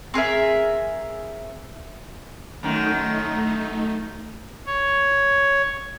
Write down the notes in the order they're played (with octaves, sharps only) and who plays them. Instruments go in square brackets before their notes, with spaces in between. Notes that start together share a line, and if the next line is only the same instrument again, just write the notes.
[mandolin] C4 G#4 A#4 E5
[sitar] F#2 D#3 [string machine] A3 D#4
[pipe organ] C#5